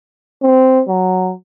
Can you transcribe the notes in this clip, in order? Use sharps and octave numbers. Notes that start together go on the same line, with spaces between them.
C4
F#3